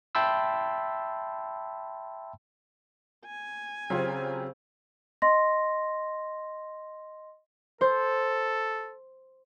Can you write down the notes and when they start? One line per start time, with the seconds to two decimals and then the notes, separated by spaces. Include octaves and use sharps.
0.15 E5 G5 A5 B5 C6 E6
3.26 G#5
3.90 C#3 F#3 C4 F4 G4
5.22 D#5 C6 A#6
7.81 A4 C5